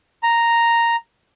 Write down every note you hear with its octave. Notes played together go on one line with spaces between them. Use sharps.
A#5